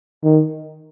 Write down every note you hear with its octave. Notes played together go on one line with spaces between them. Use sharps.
D#3